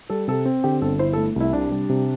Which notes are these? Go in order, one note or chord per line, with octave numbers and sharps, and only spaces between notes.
G3 A4
C3 A4
C4
D3 G4
G1 A4
E4 C5
A3 A4
C2 E4
C3 D4
G3
C3